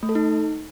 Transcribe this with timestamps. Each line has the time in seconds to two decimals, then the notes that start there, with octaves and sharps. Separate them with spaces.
0.03 A3
0.09 A4
0.15 D#4